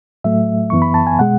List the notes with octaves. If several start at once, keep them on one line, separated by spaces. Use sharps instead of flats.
A2 F#3 A3 E5
F#2 E3 B3 C#6
B5
A5
G#5
B2 G#3 F#5